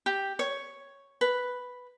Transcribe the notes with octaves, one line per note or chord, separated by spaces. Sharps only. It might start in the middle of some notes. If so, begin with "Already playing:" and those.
G4
C#5
B4